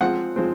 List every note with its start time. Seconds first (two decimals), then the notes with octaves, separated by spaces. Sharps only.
0.01 F3 G#3 C4 F#5
0.36 F3 G#3 C4